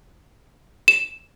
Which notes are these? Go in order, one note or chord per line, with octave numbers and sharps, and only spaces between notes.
E7